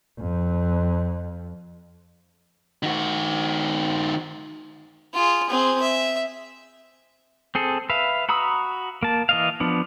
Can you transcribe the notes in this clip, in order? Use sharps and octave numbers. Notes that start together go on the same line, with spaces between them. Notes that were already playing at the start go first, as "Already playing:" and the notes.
F2
D#3 F#4
F4 G#4
C4 G#4
E5
C4 G#4 A4
B4 E5 F5
F#4 A#5 B5 D#6 E6
A#3 A5
E3 D#5 F5
F3 B3 D4